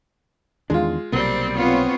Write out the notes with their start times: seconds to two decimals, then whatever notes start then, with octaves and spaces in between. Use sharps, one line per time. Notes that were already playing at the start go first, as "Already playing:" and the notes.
0.70 E2 D#3 G#3 D4 F4
1.12 B1 C3 G3 A#3 C4
1.56 B3 C4 F4 C#5